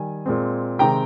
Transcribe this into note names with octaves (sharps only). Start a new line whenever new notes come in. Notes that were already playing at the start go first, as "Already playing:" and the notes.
Already playing: D#3 G3 G#5
A#2 G#3 C4
C3 D#3 G#3 C4 G5 A#5